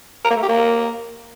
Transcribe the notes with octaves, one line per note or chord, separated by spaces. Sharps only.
A#4
A#3
A3
G4
A#3